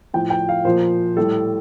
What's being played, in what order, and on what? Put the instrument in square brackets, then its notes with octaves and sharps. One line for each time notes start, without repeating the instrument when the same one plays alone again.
[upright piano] A2 F3 G5
G5
F5
A#2 F3 C5
A2 G3 A4